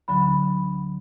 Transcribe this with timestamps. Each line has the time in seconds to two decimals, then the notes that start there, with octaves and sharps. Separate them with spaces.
0.08 D2 D3 F#3 B5